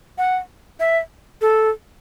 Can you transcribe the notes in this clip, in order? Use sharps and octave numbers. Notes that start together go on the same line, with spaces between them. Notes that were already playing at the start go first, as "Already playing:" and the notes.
F#5
E5
A4